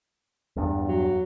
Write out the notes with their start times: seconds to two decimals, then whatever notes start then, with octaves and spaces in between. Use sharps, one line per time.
0.56 E2 G2
0.87 F#3